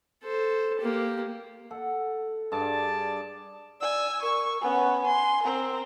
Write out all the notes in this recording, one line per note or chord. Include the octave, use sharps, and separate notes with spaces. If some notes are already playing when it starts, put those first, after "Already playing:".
A4 C5
A#3 G4
A4 F#5
G2 G#4 D5 A5
D5 G#5 E6
A#4 C#6
B3 C#4 G#5
C6
C4 A#4